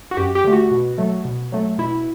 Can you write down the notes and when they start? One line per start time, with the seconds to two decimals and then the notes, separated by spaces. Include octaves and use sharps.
0.11 F#4
0.17 F#2 G4
0.35 G4
0.44 D3 A3
0.53 F#4
0.71 B2
0.98 F#3 A3
1.25 B2
1.52 F#3 A3
1.78 B2 E4